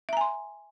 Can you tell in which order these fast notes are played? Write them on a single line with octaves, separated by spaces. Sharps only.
E5 A#5 G#5 C6